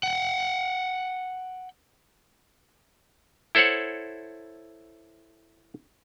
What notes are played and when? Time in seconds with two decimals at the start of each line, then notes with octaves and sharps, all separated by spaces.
0.03 F#5 G5
3.55 E4 A4 C5 C#5 F#5